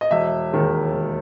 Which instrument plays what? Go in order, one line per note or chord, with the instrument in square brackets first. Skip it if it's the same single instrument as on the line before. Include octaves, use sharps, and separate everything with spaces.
[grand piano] D#5
E1 E5
D#2 D#3 G#3
E1